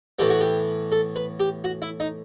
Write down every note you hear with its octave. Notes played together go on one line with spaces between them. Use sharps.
A2 E3 B3 G4
F#4
G4
A4
B4
G4
F#4
E4
D#4